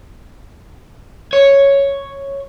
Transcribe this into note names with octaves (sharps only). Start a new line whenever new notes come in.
C#5